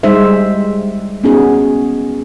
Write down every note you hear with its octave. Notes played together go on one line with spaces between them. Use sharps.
G3 G#3 D#4 C5 E5
B3 C#4 D#4 F#4 G#4